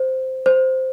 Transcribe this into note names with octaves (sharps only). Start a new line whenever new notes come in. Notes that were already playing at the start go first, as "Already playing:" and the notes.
Already playing: C5
C5